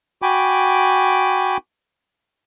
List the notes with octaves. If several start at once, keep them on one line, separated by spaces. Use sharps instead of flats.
F#4 G5 G#5 B5 D6